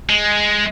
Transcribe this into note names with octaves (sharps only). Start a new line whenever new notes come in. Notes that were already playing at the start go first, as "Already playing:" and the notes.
G#3